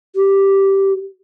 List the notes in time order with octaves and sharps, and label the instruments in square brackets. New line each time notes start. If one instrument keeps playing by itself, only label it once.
[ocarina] G4